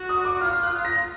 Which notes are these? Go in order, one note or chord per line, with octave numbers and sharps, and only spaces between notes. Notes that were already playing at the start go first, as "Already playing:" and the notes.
Already playing: F#4
D#6
D6
F4 F6
F#6
A#6